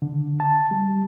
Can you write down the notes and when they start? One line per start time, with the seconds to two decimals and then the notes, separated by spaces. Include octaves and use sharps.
0.02 D3
0.40 A5
0.71 G3